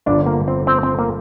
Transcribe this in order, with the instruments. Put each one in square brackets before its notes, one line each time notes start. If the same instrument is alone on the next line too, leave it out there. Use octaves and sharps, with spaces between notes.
[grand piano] G1 G2 D3 F3 [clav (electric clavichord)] D4
[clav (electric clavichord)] A#3
C4
C4
C4
A#3